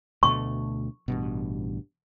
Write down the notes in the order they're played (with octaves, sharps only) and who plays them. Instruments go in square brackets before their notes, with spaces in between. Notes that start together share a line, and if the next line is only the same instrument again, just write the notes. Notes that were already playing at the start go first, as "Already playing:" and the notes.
[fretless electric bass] D2 B2 A3 [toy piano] C#6
[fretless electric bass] A1 G2 B2